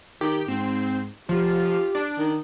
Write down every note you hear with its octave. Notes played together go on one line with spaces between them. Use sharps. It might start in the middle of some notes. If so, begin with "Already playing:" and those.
D#3 G4
G#2 C4
F3 F4 G4
D4
D#3